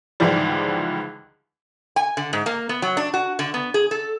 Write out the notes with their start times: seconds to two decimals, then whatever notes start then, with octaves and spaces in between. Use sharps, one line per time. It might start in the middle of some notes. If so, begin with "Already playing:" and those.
0.20 C#2 G#2 D3 E3 F3 G3
1.96 G#5
2.17 D3
2.33 G#2
2.46 A#3
2.69 B3
2.82 F#3
2.97 D4
3.14 F#4
3.39 D3
3.54 B3
3.74 G#4
3.91 A4